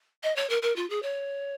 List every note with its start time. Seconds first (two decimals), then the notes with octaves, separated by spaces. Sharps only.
0.23 D#5
0.36 C#5
0.50 A#4
0.62 A#4
0.76 F4
0.90 G#4
1.03 C#5